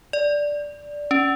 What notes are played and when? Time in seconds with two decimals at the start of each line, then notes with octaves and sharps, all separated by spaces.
0.13 D5
1.11 C#4